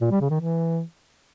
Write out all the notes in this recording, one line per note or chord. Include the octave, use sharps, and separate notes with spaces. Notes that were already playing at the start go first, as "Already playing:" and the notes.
A#2
G3
C#3
D#3
E3